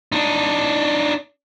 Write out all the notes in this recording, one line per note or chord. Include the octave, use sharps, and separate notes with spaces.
D4 D#4